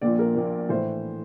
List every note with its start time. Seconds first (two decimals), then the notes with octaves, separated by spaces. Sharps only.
0.01 A#1 A#2 F3 D5
0.19 A#4
0.35 A#1 A#2 F3
0.69 A2 E3 C5